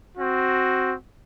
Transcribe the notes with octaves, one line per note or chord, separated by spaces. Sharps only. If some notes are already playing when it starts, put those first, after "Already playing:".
C4 F#4